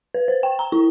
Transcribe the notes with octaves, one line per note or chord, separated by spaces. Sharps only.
B4
C5
G5
A#5
E4